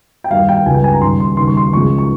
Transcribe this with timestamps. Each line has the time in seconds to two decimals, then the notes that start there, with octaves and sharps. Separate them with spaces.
0.24 G5
0.31 D#2 D#3 G3 F5
0.49 G5
0.66 C#2 C#3 G3 G#5
0.74 G5
0.84 G#5
0.93 A#5
1.01 D#2 C#3 G3 C6
1.20 C6
1.37 D#2 C#3 G3 C6
1.47 C#6
1.57 C6
1.73 C#2 C#3 F3 G#3 C#6
1.98 C#6